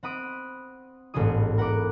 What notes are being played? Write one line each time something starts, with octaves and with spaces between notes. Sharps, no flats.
C4 F#5 B5 D#6 D7
E1 A1 G#2 B3 G#4 D#6
A#4 F#5 B5 D6